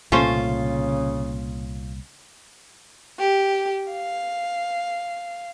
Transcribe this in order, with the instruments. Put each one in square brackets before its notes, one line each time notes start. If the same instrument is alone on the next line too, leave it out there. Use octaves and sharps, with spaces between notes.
[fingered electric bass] C2 A#2 A#3 [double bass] C#3 [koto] A3 C#4 C5 [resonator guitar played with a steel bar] F4
[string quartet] G4
F5